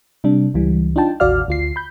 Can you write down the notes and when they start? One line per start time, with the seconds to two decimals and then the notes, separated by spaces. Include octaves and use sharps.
0.24 C3 G3 D4
0.54 C#2 E3 G3
0.96 D4 D#4 F4 G5 A5
1.20 A1 D#2 F#4 D5 F5 F6
1.48 D2 F4 C7
1.76 B5 G6